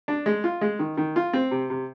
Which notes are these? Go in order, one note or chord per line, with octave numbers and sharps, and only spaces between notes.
D4
G#3
F4
G#3
D#3
D#3
F4
C4
C3
C3